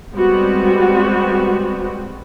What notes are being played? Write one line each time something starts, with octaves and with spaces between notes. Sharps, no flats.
G3 G#3 B3 C4 F#4